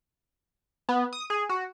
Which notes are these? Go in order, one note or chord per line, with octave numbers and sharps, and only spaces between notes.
B3
D#6
G#4
F#4